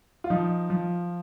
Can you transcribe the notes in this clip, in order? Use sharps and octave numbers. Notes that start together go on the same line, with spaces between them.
F4
F3 D#4
F3